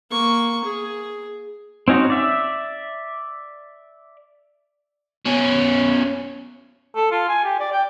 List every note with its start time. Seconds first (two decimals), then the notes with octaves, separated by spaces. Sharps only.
0.10 A#3 C#6
0.64 G#4
1.88 C4 C#4 D#4 F#4
2.10 D5 E5
5.25 B2 C#4
6.95 A4
7.11 F4
7.28 G#5
7.44 G4
7.59 D5
7.72 G5